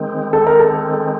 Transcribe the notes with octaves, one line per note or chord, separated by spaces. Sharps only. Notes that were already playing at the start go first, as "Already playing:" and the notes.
Already playing: D#3 G#3 C4
A4
A#4
A4